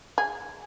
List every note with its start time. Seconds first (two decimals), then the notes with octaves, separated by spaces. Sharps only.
0.18 G#4